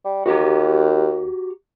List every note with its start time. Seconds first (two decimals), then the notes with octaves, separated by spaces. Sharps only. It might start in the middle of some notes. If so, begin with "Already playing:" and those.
0.05 G3
0.26 D#2 F#4 G4 A#5